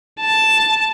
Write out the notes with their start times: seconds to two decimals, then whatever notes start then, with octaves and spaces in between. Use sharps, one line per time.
0.20 A5